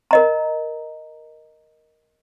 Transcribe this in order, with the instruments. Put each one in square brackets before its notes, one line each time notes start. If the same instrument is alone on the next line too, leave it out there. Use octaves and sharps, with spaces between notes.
[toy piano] A#4 D#5 A#5